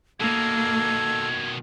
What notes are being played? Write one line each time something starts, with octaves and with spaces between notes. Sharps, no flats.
B2 D#3 A#3 A4 G#6